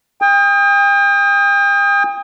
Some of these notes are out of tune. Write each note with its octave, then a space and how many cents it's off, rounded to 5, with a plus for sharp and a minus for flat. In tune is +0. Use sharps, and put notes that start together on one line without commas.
G5 +40 D#6 +10